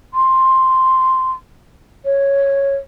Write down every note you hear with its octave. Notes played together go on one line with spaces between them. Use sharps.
C6
C#5